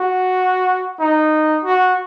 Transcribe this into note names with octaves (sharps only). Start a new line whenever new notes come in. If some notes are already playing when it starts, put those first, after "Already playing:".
Already playing: F#4
D#4
F#4